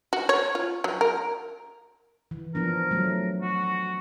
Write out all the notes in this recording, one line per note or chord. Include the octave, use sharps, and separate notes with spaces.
F#4
C#5
F4
F#3
A#4
E3
F3 B3 D4 A#4
F#3 A3
F#4